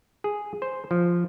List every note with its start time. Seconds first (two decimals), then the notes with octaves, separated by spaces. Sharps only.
0.24 G#4
0.62 C5
0.91 F3